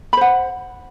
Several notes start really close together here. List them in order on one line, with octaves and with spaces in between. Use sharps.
B5 C5 F#5